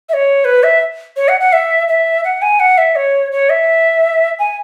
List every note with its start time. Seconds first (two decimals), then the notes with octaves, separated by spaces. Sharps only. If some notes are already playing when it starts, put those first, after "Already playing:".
0.09 E5
0.13 C#5
0.45 B4
0.63 E5
1.16 C#5
1.28 F#5
1.40 F#5
1.52 E5
1.88 E5
2.24 F#5
2.42 G#5
2.59 F#5
2.78 E5
2.96 C#5
3.32 C#5
3.49 E5
4.39 G#5